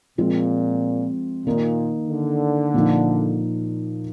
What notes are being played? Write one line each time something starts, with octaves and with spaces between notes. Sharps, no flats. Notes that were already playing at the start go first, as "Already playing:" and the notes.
A#2 F3 G#3 C4 F4
A#2 D#3 A#3 D#4
D3
A#2 F3 A#3 D#4